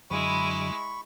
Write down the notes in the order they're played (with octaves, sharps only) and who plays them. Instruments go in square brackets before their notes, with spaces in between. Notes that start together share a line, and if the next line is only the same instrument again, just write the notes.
[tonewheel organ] F#2 D3 F#3 [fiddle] G#3 E4 [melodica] B5 C#6